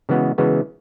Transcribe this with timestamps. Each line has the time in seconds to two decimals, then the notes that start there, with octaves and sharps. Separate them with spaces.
0.09 C#3 E3 G#3 B3 F#4
0.38 C#3 E3 G#3 B3 F#4